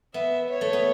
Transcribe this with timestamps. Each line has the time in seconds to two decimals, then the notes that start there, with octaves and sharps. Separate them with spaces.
0.14 B3 E5
0.49 C#5
0.61 A3
0.73 B3